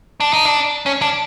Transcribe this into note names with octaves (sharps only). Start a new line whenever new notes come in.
D4
D#4
D4
C#4
D4